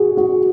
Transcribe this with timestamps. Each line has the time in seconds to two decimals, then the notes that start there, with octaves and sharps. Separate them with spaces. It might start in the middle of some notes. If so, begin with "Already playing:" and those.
Already playing: F#4 G#4
0.17 F#4